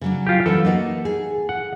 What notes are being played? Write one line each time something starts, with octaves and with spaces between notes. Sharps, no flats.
C#3 F#3 D4
F4 G4
E3 F#3 C#4 A4
A#3 D#4 F#4
G#4
F#5